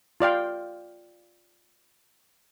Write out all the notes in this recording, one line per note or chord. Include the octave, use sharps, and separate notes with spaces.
F4 D5 F5 G5